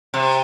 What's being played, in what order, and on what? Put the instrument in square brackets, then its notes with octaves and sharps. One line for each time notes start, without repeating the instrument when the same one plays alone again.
[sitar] C3